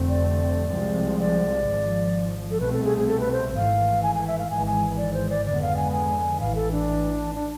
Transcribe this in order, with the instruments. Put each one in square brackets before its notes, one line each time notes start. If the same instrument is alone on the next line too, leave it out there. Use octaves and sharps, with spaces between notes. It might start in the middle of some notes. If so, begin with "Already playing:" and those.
Already playing: [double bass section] F1 F2 D3 A3 C4
[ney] D5
[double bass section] C2 C3 F3 G#3 C4
[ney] D5
[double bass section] G#1 G#2 F3
[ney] A4
[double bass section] C2 B2 A3 C4 [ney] B4
[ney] A4
G#4
G#4
A4
B4
C5
[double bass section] G#1 G#2 E3 A3 [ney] F5
[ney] G#5
G#5
E5
F5
[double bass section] G#1 G#2 E3 G#3 [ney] G#5
[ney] G#5
D5
C5
D5
[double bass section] F2 D3 G#3 B3 [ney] D5
[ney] F5
G#5
G#5
[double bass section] A1 A2 E3 [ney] F5
[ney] A4
D4
D4